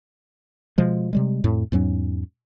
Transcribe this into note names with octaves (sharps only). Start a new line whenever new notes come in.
B2 F3 G#3
C3 G3 G#3
F2 A2
E2 G#2 F#3 C#4